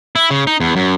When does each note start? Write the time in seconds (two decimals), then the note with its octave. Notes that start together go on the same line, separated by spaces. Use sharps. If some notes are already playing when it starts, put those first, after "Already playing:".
0.16 E4
0.30 C#3
0.47 D#4
0.60 E2
0.76 F#2